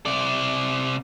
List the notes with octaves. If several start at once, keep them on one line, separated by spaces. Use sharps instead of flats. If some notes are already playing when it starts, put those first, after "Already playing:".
C3 D5